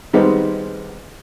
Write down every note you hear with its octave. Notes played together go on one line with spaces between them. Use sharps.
D#3 G3 G#3 B3 C4